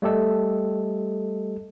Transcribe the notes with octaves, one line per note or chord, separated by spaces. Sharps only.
G3 A3 G4 A4 D#5